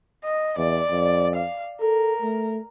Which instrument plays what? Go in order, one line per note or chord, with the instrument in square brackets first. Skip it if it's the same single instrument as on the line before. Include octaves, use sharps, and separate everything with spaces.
[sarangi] D#5
[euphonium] E2 [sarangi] D5
[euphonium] F2
[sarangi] F5
[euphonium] A4 [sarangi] A#4
[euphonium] A3